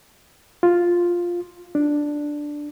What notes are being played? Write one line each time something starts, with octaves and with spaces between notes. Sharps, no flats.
F4
D4